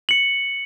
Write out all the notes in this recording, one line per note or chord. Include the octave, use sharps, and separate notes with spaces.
C#7 F#7